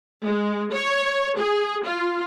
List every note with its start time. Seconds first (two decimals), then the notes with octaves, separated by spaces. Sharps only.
0.25 G#3
0.73 C#5
1.36 G#4
1.85 F4